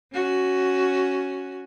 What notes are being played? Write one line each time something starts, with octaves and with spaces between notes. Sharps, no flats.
C#4 F#4